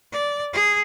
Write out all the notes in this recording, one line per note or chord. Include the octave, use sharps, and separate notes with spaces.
D5
G#4